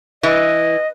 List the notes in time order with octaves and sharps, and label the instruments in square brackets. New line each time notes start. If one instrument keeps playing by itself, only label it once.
[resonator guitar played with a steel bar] E3 [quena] D#5